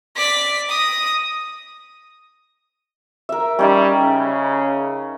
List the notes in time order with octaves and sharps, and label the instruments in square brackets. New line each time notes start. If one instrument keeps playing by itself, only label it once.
[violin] D5 B6
D#6 A#6
[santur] A#4 E5
[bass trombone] G3 [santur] C#4 D#4 E5
[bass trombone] C#3